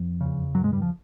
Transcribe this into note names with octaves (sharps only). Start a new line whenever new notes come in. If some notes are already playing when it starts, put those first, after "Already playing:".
Already playing: F2 F3
E2 C#3
F#2 F#3
G#2 G#3
G2 G3
F3